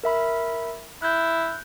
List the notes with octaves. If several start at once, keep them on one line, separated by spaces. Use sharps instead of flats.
A#4 E5 B5
E4 F#6 G6